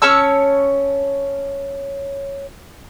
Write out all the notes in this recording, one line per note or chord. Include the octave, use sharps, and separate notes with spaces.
C#4 C#5 A5 E6